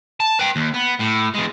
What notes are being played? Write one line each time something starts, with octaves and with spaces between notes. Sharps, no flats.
A5
B4 G5
D#2
B3
A2
E2 G#3